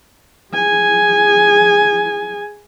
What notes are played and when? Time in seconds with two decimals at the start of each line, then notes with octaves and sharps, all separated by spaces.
0.54 G#4 G#5